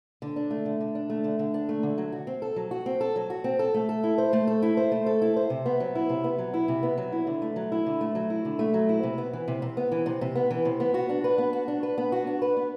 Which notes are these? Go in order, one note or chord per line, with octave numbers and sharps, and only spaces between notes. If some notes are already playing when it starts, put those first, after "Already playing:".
D3
D4
A3
D3
D3
D4
A3
D3
D3
D4
A3
D3
F#3
F#4
C4
A4
F#3
F#4
C4
A4
F#3
F#4
C4
A4
A3
A4
E4
C5
A3
A4
E4
C5
A3
A4
E4
C5
C3
B3
F#3
E4
C3
B3
F#3
E4
C3
B3
F#3
E4
D3
A3
F#3
E4
D3
A3
F#3
E4
D3
A3
F#3
E4
C3
B3
E3
C3
C3
B3
E3
C3
C3
B3
E3
C3
B3
F#4
D4
B4
B3
F#4
D4
B4
B3
F#4
D4
B4
B3